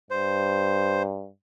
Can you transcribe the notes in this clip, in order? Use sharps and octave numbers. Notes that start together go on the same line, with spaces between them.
G2 C5